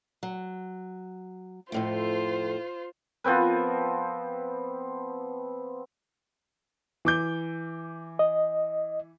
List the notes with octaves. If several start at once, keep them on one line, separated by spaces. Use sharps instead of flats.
F#3
F2 A2 A3 F4 C5
F3 B3 C4 B4
E3 D6 G6
D#5